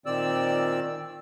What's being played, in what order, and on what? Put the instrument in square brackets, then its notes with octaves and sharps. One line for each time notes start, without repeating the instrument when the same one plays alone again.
[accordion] A#2 D#3 C4 D5 E6